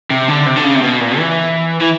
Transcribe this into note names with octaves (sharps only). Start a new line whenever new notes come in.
C3
D3
C3
D3
C#3
C3
B2
A#2
E3
E3